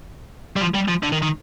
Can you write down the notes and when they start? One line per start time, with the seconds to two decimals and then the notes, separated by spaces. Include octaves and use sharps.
0.56 G3
0.61 F3
0.74 G3
0.88 F3
1.03 D3
1.12 D#3
1.22 D#3